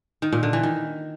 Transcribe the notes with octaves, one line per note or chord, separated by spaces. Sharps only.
D#3
A#2
D3
E3
D#3